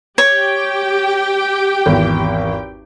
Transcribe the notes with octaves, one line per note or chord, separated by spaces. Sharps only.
G4 C#5 G5
G#1 E2